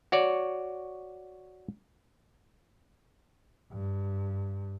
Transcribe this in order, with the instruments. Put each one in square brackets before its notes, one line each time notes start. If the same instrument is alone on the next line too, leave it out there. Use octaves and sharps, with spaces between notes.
[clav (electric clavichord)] F#4 C#5 D5
[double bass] G2